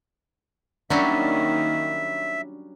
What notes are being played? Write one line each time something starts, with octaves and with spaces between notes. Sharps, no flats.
D#3 F#3 G3 A#3 C#4 D4 E5